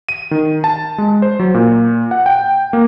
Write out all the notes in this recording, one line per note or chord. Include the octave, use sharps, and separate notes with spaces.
D#7
D#3
A5
G#3
C5
F#3
A#2
F#5
G5
A#3